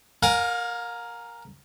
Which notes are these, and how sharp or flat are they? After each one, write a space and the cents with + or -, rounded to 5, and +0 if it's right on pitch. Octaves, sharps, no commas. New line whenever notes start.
A#4 +0 F5 +40 G#5 +0